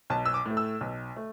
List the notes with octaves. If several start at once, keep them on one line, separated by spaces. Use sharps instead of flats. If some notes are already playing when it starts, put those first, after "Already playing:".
B1 A5
E6
D6
A2 A3
E6
B1
A3